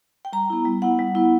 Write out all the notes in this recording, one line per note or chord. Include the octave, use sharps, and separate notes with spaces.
G5
G3 A#5
B3 E4
G3
B3 E4 F#5
G3
B3 E4